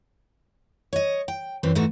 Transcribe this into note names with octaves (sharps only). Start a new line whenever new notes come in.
C#5 D#5
G5
F#2 E3 C4
G#2 E3 A3 D#4 F#4